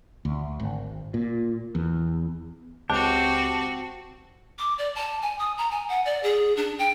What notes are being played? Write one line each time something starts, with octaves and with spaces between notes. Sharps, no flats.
D2
G#1
A#2
E2
C#2 C4 F#4 G4 A5
D6
D5
A5
G#5
D#6
A#5
G#5
F#5
D5
G#4
D4
G5